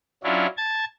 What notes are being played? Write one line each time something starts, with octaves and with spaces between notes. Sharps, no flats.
F#3 C#4 D4 E4 F4
A5 G#6 A6